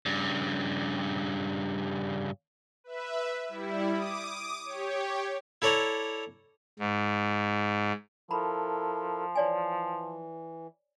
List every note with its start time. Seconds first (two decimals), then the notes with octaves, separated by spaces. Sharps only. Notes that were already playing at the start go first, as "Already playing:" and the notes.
0.06 G2 C#3
2.84 B4 E5
3.49 G3 E4
3.91 D6 D#6
4.64 G4 C#5
5.62 E4 A4 C#5 D5 A#5
6.79 G#2
8.31 F3 E4 A4 A#4 A#5 B5
9.36 E3 C#5 D5 G#5